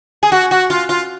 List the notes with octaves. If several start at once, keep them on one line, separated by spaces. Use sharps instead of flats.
G#4
F#4
F#4
F4
F4